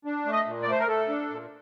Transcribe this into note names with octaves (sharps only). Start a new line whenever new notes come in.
D4
A3
D#5
A#2
D5
A3 C5
A#4
A3 A4
D4
A#2